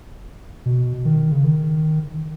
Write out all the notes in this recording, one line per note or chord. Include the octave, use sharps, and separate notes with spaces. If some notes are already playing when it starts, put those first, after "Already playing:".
B2
D#3
C#3
D#3